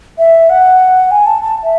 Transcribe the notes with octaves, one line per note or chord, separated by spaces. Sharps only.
E5
F#5
G#5
A5
A5
E5